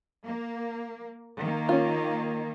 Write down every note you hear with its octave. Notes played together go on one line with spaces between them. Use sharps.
A#3
D#3 A#3
C#4 F4